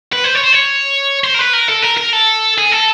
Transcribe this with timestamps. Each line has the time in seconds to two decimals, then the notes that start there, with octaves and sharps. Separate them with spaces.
0.13 B4
0.24 C5
0.35 C#5
0.44 C5
0.53 C#5
1.24 C5
1.34 A#4
1.39 B4
1.53 A#4
1.69 A4
1.83 A#4
1.97 A#4
2.13 A4
2.58 G#4
2.72 A4